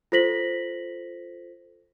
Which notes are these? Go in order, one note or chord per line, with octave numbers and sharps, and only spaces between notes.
F4 A4 C5 A#6 B6 F#7